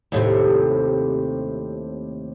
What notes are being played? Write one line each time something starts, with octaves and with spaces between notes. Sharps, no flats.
D#2 A2 C3